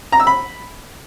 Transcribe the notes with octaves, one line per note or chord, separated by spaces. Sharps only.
A#5
E6
B5